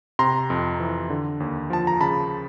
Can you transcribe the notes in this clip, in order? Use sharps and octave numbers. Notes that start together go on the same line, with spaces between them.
C3 A#5 C6
F2
E3
D3
D#2
F3 A5
A#5
C#3 A5 B5